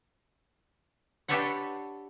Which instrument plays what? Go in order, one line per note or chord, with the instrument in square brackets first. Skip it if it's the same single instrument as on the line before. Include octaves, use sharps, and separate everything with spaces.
[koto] D4 G4 A4 B4 C#5 F#5